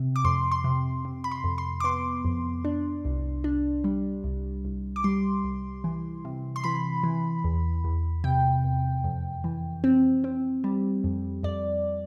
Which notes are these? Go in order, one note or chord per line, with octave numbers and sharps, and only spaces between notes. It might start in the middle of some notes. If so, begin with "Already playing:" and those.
Already playing: C3
D6
F2 C6
C6
C3
C3
B5
C6
F2
C6
D6
B3 C6
F2
D4
C2
D4
G3
C2
C2
D6
G3 C6
C2
E3
C3
C6
E3 B5
E3
E2
E2
C3 G5
E2
F2
E3
C4
C4
G3
F2
F2 D5